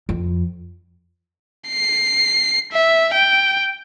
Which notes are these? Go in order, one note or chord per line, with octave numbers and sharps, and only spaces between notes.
F2
C7
E5
G5